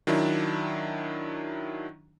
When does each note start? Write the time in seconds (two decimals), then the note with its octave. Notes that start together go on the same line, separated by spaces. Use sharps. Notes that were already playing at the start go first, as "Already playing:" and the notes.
0.07 D#3 F#3 D4 E4